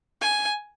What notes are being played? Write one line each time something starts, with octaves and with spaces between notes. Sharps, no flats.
G#5